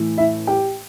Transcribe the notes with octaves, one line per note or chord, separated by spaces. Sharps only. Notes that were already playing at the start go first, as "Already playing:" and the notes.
Already playing: A2 E3 A3
E4 E5
G4 G5